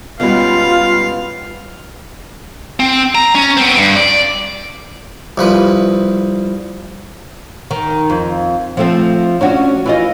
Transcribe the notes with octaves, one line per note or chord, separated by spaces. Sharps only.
G#2 B2 G3 B3 C#4 F4 F5
C4
A#5
C#4
B3 C4
G2
D5
C2 F3 B4
D#3
F2
F3 A3 C4
C#4 D4 F#4
E3 F4 D#5